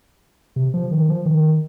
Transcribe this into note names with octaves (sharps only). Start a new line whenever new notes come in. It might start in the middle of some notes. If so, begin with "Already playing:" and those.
C3
F3
D#3
F3
D#3